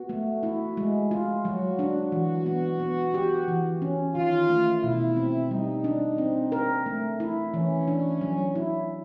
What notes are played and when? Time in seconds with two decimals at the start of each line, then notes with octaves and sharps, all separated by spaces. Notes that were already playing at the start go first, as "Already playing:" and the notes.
Already playing: B3 F#4
0.09 A3
0.43 E4
0.77 G#3
1.11 F4
1.45 F#3 F#4
1.79 D4
2.12 E3 F#4
2.46 B3
2.80 B3
3.14 G4
3.48 E3
3.82 C#4
4.15 D#3 F4
4.49 A3
4.83 B2 E4
5.17 C4
5.51 G3 D#4
5.84 D4
6.18 C4
6.52 A#4
6.86 A3
7.20 E4
7.54 E3 C#4
7.88 D4
8.21 F#3
8.55 E4